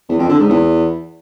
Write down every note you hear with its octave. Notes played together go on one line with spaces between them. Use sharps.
E2
F2
D3
G#2
E2